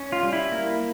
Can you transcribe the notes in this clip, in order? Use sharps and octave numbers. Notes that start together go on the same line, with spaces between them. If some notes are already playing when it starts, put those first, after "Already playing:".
Already playing: C#4
F4
G3
E4
A#3